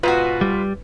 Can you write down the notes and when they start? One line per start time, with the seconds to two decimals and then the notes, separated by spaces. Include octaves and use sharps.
0.03 G#2 B2 F4 F#4 B4
0.41 G3